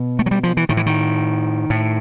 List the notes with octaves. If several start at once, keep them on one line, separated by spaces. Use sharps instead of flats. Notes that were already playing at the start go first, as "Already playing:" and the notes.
Already playing: B2
A3
F#3
G3
F3
E3
A2 D#3
E3
D#3
A2